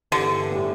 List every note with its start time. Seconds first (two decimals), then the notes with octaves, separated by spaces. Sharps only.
0.12 G1 G2 D3 E3 G3
0.51 A2 E3 G3